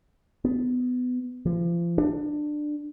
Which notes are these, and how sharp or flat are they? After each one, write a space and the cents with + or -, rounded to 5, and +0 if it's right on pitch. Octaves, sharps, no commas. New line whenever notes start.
B3 +20
F3 -35
D4 +20